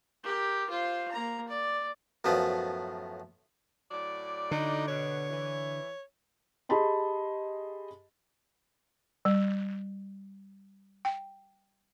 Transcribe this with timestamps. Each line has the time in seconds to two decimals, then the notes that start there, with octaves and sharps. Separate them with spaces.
0.24 G4 A#4
0.70 F4 C5
1.11 A#3 A#5
1.48 D5
2.24 F#2 A2 F3 B3
3.91 A2 F#3 D5
4.51 D3 D#4
4.88 B2 C#5
5.30 E3
6.69 G4 G#4 D#5 A5 B5 C6
9.25 G3
11.05 G5